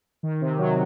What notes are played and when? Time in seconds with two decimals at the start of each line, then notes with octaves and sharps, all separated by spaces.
0.23 D#3
0.41 C3
0.58 F#3